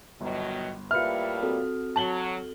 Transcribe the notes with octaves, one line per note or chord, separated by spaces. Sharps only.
G1 B2 D#3 F#3
A2 G3 A#3 F4 B4 E5 F6 C#7
C4 F#4 A4
F#3 A5 F#7 G7